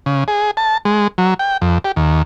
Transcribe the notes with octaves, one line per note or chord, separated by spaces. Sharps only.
C#3
G#4
A5
G#3
F#3
G5
F2
G4
D#2